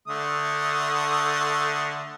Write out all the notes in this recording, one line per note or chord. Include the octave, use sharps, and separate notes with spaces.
D3 A3 D#6